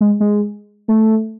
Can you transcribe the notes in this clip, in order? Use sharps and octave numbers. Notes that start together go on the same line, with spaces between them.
G#3
G#3
A3